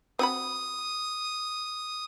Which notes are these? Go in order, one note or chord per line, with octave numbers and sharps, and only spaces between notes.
C4 F#4 B5 D#6